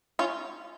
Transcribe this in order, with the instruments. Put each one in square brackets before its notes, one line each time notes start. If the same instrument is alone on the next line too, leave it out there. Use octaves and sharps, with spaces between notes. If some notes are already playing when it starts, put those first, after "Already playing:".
[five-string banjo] C#4 F4